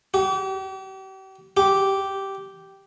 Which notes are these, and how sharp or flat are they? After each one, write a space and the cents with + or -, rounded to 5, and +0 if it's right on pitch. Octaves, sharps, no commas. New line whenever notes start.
G4 -40
G4 -10